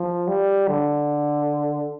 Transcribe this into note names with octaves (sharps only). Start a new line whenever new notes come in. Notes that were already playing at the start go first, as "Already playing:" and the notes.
Already playing: F3
G3
D3